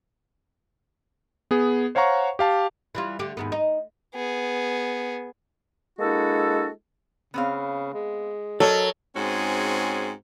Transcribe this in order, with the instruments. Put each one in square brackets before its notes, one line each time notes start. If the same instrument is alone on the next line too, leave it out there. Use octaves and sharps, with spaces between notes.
[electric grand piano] B3 G#4
C5 C#5 F5 F#5 A#5 C#6
G4 F5 A5
[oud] E3 G3 F4
D3 A3 G4
D#2 G#2 B3
D#4
[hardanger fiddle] B3 G#4
[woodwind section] G#3 A#3 D4 E4 F#4 A4
[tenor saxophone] C#3 [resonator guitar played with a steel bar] B3 C4 F5
[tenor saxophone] G#3
[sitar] F#3 [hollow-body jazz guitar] A4 [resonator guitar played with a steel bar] A#4 D#5 [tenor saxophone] C#5
[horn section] G#2 C4 C#4 F#4 G#4